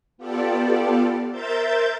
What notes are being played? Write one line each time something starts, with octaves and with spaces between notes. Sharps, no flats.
B3 F4 G4 A4 D5
A#4 C5 E5 G6 A6